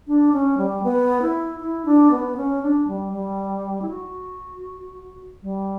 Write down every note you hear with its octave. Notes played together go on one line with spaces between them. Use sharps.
D4
C#4
G3
B3
E4
E4
D4
B3
C#4
D4
G3
G3
E4
F#4
G3